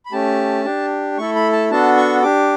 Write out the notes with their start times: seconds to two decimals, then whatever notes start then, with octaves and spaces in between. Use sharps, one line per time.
0.06 B5
0.12 A3 C#4 G4 A5
0.65 D4 G4
1.18 A3 E4 A4 C#6
1.36 B5
1.52 A5
1.71 B3 D4 F#4 A4 A5
1.97 C#6
2.23 D4 G4 D6